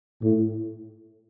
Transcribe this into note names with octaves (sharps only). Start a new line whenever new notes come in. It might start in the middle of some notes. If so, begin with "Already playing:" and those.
A2